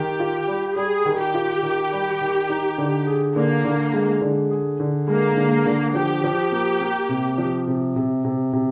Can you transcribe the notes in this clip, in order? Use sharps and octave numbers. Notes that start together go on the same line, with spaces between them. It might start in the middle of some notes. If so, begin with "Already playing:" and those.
Already playing: D#3 G4
F4
G3
G3 G#4
D#3
G4
F4
D#3
G3
D#3
D#4
D3
G#4
D3 A#3
D3
G#3
D3
G#4
D3
G#3 A#3
D3
D3
F3 G4
F3
A#3
A#3
C3
F3
C3
C3
C3
C3